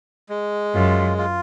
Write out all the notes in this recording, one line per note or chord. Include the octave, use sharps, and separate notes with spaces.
G#3
F#2 F4
F4